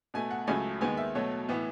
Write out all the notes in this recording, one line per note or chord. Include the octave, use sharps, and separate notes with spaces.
B2 A3 G#5
F#5
C#2 C#3 F#3 A3 G#5
D#2 D#3 G#3 B3 G#5
E5
B2 F#3 A3 C#5
A2 E3 B3